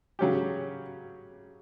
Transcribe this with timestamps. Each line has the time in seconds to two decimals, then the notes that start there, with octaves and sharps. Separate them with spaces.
0.19 C#3 F#3 C#4 G4